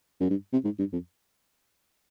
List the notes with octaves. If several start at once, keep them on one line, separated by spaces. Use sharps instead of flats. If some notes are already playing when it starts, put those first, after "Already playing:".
F#2
G2
C3
G#2
G2
F2